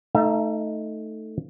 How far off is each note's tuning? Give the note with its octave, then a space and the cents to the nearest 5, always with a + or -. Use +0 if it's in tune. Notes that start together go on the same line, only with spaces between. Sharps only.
A3 +0 D#4 +5 E5 +40